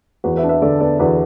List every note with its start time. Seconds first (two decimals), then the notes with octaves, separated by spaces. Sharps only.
0.24 E2 F#4 B4
0.36 B4 E5
0.43 D4
0.49 B4 E5
0.62 D3 A4 D5
0.80 B3 A4 D5
0.99 E2 F#4 B4